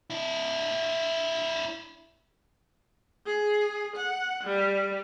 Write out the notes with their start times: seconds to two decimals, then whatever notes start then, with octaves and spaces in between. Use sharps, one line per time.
0.10 D4 E4
3.26 G#4
3.96 F#5
4.44 G3